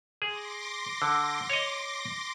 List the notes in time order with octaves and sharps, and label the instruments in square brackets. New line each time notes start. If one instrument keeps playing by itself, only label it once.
[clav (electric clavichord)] G#4 [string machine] C6 D6 A#6
[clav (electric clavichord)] D3
C#5 D#5